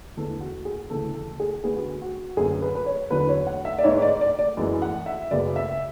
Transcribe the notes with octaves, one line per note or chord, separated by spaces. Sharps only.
E2 D3 G#3 B3 A4
F#4
G#4
D2 C#3 E3 B3 A4
A4
G#4
D2 D3 G#3 B3 G#4
F#4
F#4
F#2 D3 F#3 B3 G#4
B4
B4
C#5
E2 D3 F#3 B4
C#5
F#5
E5
D5
G#2 G#3 B3 C#5
D5
D5
D5
F#2 E3 G#3 B3
F#5
E5
F#2 C#3 G#3 B3 D5
E5